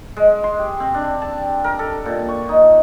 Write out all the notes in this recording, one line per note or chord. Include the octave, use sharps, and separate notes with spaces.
G#3
C6
G4
C4
D4
A5
A#4
A4
A#2
C#6
D#4